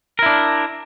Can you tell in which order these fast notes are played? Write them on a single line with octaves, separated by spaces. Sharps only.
A#4 E4 D4